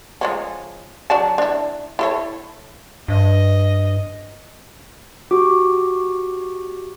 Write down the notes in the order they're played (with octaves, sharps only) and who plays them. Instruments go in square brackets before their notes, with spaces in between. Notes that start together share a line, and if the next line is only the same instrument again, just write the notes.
[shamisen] F3 G#3 C#4
F#3 D4 A5
D4 E4
E4 A4 C#5
[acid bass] G2 [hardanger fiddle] D#5
[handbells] F#4 G4 D6